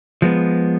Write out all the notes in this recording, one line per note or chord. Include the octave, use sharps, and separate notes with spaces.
F3 G#3 B3